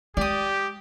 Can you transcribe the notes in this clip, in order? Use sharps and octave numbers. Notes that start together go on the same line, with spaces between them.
G#3 G4 D5 D#6